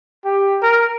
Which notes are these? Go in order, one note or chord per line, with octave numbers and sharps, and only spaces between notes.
G4
A#4